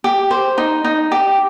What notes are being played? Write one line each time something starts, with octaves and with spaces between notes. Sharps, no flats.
G4
C5
D#4
D#4
G4